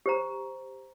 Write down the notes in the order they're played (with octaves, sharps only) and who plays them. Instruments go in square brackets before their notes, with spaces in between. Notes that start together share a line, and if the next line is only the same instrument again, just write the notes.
[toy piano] G4 C5 A#5